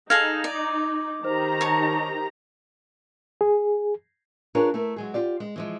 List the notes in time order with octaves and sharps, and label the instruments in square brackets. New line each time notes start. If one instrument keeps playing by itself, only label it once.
[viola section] D#4 [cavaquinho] G#4 A4 F5 [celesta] G#6 A#6 F7
[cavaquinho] D5
[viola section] D#3 G4 A#5 [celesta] C5
[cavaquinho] C#5 A5
[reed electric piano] G#4
[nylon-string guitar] D4 F4 G#4 A#4 B4 C#5
A3 E4 A#4
F#3 G#3 G#4
F4 G4 D5
G#3
E3 F3 G#3